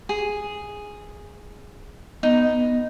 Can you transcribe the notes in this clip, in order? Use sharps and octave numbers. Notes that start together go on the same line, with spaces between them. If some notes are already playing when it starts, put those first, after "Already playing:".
G#4
B3 D#4